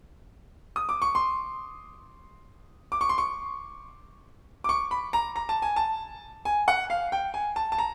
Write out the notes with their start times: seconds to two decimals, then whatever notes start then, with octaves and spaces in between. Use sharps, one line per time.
0.76 D#6
0.89 D6
1.02 C#6
1.15 C6
2.92 D6
3.01 C#6
3.09 C6
3.18 C#6
4.64 D6
4.69 C#6
4.91 B5
5.13 A#5
5.36 A#5
5.49 A5
5.62 G#5
5.76 A5
6.45 G#5
6.68 F#5
6.90 F5
7.12 G5
7.34 G#5
7.56 A5
7.72 A5
7.78 A#5